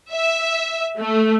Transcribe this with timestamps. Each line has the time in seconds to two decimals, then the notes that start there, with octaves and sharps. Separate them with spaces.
0.12 E5
1.00 A3